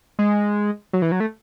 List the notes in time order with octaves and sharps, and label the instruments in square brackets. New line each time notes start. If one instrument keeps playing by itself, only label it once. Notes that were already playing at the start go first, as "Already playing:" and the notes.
[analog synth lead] G#3
F#3
E3
F#3
A3